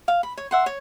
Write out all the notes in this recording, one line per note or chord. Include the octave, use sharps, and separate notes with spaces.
F5
B5
C#5
E5 F#5 C6
C#5